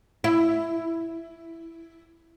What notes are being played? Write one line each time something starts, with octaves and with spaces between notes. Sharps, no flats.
E4